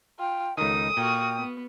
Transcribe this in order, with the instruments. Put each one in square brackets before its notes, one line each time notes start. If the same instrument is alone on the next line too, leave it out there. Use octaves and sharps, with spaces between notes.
[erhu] F4 [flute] G5
[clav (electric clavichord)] C#2 D#3 [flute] D#4 [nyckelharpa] A4 [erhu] D#6
[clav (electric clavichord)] A#2 [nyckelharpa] F#4 F5 [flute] G5
[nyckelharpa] B3